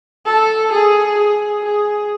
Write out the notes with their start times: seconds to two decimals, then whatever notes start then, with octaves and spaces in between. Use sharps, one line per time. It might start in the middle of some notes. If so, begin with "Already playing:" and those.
0.26 A4
0.72 G#4
1.18 G#4
1.65 G#4